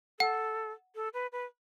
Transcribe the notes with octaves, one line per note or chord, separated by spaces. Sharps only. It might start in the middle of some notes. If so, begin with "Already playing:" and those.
A4 F#5
A4
B4
B4